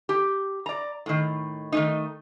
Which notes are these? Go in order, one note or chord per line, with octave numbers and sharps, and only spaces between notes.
G4
D5 A#5
A2 D#3
D#3 A3 D#4